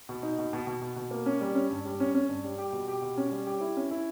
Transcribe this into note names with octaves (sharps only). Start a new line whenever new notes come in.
B2
D#4
B2
B2
B2
B2
B2
A#3
C#4
G3
C#4
G2
G3
C#4
C#4
G2
G3
G4
B2
G4
B2
C#4
G3
G4
E4
C#4
E4